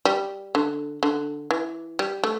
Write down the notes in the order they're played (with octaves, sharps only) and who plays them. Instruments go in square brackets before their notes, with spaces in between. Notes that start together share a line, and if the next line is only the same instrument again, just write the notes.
[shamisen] G3
D3
D3
E3
G3
A3